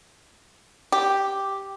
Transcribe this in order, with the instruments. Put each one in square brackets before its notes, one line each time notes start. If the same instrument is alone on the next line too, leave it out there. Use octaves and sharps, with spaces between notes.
[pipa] G4